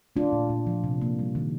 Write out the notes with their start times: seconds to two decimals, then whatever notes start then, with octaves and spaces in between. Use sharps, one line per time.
0.16 A3 D4 F4
0.33 A#2
0.50 A#2
0.67 F3
0.84 C3
1.01 A#3
1.19 G3
1.35 D#3